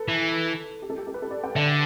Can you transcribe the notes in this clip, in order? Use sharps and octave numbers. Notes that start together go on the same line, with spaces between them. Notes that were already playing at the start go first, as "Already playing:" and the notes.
Already playing: A4 B4
E3
G4
A4
G4
A4
B4
A4
D5
G5
D3 E5